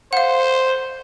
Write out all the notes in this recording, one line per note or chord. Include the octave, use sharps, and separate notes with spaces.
C5 F5 F#5